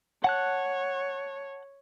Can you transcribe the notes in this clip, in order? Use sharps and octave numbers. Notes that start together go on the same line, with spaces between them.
C#5 F#5 A5 F#6